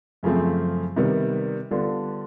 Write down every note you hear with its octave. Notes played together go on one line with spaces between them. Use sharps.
F#2 C#3 F3 A3 C4
C3 D#3 G3 B3
D3 G3 B3 D4 F4